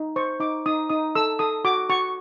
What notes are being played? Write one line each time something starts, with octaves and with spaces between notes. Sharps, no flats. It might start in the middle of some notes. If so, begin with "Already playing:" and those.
Already playing: D#4
C5 C#6
D#4 D6
D#4 D#6
D#4 D#6
A4 E6
A4 D#6
F#4 D6
F#4 C#6